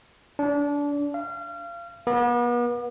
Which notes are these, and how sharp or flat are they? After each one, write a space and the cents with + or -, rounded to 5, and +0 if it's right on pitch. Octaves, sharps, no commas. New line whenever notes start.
D4 -25
F5 -30
B3 -40